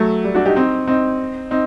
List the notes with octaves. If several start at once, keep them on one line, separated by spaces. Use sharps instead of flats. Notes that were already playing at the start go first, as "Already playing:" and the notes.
Already playing: F#3 A3
G3
D4 F#4
D#4 G4
C4 D#4
C4 D#4
C4 D#4